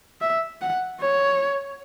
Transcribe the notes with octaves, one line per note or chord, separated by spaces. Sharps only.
E5
F#5
C#5